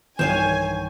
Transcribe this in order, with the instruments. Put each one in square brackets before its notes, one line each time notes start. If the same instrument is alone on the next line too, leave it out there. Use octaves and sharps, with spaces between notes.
[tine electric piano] B1 G2 E3 [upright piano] D#3 [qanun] C5 C#5 F5 [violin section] G#5